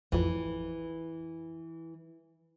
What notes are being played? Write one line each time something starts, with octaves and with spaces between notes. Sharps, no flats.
A1 F2 E3